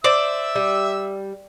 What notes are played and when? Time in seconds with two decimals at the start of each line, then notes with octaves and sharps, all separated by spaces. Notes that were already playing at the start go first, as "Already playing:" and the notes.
0.04 C5 D5 E5 E6
0.55 G3